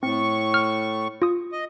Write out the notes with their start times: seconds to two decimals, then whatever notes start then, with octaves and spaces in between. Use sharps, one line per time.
0.03 A2 C4 C#6
0.54 F6
1.22 F4 D#6
1.52 D#5